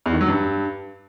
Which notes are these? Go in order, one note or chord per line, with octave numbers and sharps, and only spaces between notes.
E2
D#3
F#3
G2